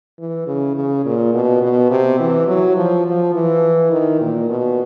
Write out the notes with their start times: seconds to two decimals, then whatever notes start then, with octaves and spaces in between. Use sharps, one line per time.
0.19 E3
0.47 C#3
0.76 C#3
1.05 A#2
1.34 B2
1.62 B2
1.91 C3
2.20 E3
2.48 F#3
2.77 F3
3.06 F3
3.34 E3
3.91 D#3
4.21 A#2
4.49 B2